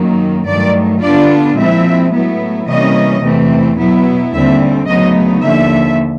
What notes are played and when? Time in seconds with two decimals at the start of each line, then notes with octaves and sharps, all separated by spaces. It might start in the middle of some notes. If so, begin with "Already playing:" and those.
Already playing: F#2 D#3 F#3 A#3
0.46 G2 D#3 F#3 A3 D5
1.01 D3 G3 B3 D4 F4 D5
1.57 A#2 F3 G#3 C4 E4 E5
2.11 A2 F#3 B3 E4
2.67 C3 E3 G3 A#3 C#4 D#5
3.22 E2 C3 E3 A3 C4
3.77 B2 F#3 B3 E4
4.33 D#2 D3 G3 C4 E5
4.87 D2 C#3 F#3 B3 D#4 D#5
5.42 D#2 D3 F3 E5